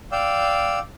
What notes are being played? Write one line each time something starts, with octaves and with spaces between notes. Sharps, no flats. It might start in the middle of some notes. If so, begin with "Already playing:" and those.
D5 F5 G5 E6